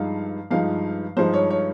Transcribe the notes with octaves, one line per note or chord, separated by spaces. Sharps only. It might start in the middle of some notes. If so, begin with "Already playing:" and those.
Already playing: G2 F3 G#3 D#4 F5
G2 F3 G#3 D#4 F5
G2 F3 G#3 D#4 C5
C#5
C#5